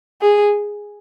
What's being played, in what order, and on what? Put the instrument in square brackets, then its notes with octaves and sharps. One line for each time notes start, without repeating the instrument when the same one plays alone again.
[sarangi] G#4